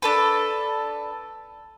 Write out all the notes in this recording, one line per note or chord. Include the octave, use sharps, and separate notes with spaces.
D4 A4 B4